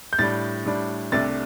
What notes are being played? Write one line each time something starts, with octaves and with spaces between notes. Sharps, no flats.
G6
A2 G3 D4 A6
A2 G3 D4
C2 C3 A3 D4 A6